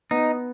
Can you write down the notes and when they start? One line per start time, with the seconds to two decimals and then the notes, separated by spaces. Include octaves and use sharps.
0.11 B3 D#4